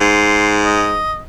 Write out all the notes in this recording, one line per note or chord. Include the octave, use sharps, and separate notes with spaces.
G#2 C6
D#5